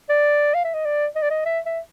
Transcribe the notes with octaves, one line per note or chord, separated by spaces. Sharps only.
D5
F5
E5
D#5
D5
D#5
D5
D#5
E5
E5